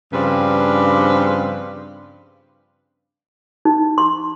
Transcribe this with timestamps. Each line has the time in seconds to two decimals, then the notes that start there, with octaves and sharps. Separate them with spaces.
0.13 G2 C#3 F3 C4 D4 B4
3.65 D#4
3.98 C6